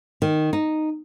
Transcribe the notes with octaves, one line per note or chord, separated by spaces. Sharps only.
D#3
D#4